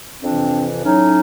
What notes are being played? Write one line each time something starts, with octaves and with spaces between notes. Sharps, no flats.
F2 C3 E3 C4 D4
A2 F#3 C#4 D#4